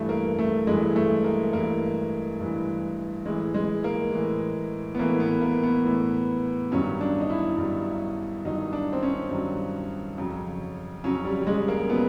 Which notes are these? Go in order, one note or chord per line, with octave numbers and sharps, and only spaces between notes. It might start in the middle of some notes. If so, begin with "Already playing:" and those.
Already playing: G2 E3 A3
A#3
A3
G2 E3 G#3
A3
A#3
G2 E3 A#3
G2 E3
A2 E3 G#3
G#3
A#3
A2 E3
B3
A2 E3 A#3
B3
A#3
B3
A2 E3
G2 D#3 F#3 C#4
D4
D#4
E4
G2 D#3 F#3
G2 D#3 F#3 D#4
D4
C4
C#4
G2 D#3 F#3
F2 C#3 F#3
F2 C#3 F#3 C#4
G3
G3
G#3
A#3
C#3 F#3 B3